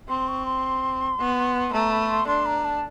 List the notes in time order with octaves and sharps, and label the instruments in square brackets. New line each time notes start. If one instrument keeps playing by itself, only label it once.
[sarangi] C4 [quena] C6
[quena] C#6
C6
[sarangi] B3
[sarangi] A3 [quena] A#5
[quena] B5
C6
[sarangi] D4 [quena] C6
[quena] A#5
A5